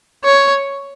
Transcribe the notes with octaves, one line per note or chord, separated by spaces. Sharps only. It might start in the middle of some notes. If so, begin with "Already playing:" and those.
C#5